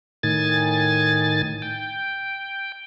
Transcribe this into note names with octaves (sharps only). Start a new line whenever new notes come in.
A2 D#3 G#5 A6
G5